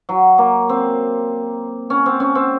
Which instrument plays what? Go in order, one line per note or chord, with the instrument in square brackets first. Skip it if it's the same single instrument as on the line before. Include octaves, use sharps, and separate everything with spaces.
[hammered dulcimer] F#3
A#3
C4
C#4
C4
C#4
C4